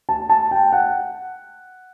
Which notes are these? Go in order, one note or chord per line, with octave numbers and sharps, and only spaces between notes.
A5
A5
G5
F#5